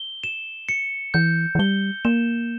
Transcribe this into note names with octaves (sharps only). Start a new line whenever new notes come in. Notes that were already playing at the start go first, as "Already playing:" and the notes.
Already playing: G7
E7
C#7
E3 G6
E3
G3 G7
A#3 E7